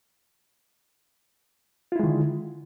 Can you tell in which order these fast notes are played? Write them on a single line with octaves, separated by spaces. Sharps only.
F4 E4 G#3 D#3 D3